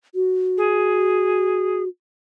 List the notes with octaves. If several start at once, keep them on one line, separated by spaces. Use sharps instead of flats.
F#4
G#4